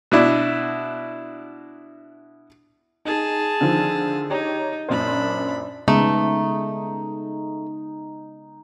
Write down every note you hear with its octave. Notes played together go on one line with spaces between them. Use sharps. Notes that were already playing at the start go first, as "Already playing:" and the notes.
B2 D4 E4
D#4 G#4 A5
D3 D#3 F3
D#4 G4 C#5 A#5
F#2 A#2 D4 C5 B5
C#3 G#3 A3 B3 D#4